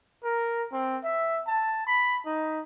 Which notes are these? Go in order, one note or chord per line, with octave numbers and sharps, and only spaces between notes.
A#4
C4
E5
A5
B5
D#4